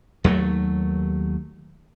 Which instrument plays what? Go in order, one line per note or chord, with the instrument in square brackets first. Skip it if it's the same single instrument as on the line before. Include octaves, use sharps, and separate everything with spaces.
[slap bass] D#2 F#3 A3